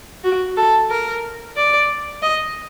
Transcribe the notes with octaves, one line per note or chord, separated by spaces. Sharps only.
F#4
A4
A#4
D5
D#5